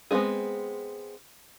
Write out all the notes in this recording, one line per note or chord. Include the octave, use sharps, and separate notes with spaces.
G#3 B3 C4 D#4 G#4